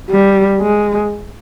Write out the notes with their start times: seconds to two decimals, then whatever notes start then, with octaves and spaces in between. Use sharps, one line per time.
0.10 G3
0.61 G#3